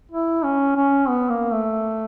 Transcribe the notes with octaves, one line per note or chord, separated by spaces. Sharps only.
E4
C#4
C#4
B3
A#3
A3